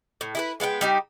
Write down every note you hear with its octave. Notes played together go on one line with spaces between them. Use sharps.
A2
E4 G#4 B4
G#3 B3 F5 G5
G3 D#4 G4